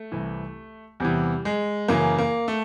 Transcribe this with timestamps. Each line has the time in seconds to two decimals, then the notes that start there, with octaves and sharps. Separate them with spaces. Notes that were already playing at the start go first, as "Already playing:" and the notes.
Already playing: A3
0.12 C2 C3 E3
1.00 E2 C3 E3 G3
1.45 G#3
1.88 F#2 C#3 E3 A#3
2.19 A#3
2.48 A3